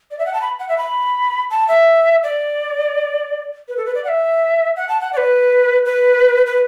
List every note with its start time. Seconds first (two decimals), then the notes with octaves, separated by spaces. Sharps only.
0.11 D5
0.19 E5
0.26 F#5
0.34 A5
0.41 B5
0.59 F#5
0.69 E5
0.78 B5
1.50 A5
1.68 E5
2.23 D5
3.68 B4
3.77 A4
3.86 B4
3.95 D5
4.04 F#5
4.08 E5
4.76 F#5
4.89 A5
5.01 F#5
5.13 D5
5.17 B4
5.85 B4
6.46 B4